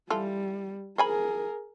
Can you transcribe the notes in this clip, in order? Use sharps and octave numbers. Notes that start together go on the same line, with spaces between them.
E3 G3 F4 A4
G#4 A#4 C5 G#5 B5